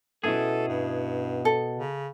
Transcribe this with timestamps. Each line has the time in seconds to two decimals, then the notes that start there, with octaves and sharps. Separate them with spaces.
0.24 B2 B3 C#4 E4 G#4 A4
0.69 G2
1.45 A4
1.76 C#3